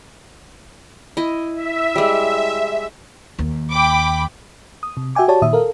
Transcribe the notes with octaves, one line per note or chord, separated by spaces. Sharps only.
E4 D#5
E5
G3 G#3
D#2
G5 B5 D6
D#6
C3
F#4 E5 G5 G#5 D6
F#4 G4 C#5 D5 A5
A#2 D#3 E5 D#6
A4 A#4 F5